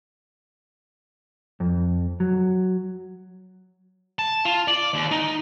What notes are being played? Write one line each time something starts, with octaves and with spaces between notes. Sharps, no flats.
F2
F#3
A5
F4
D5
D#2
D#4